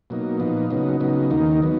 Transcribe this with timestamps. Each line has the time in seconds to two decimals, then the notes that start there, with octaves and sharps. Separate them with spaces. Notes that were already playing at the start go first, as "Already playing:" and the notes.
0.10 B2 F#3 A#3 D#4
0.40 A#2 F3 B3 D#4
0.71 C#3 F#3 B3 D#4
1.00 C#3 F#3 B3 D#4
1.30 D#2 D#3 A#3 D#4
1.62 F#3 B3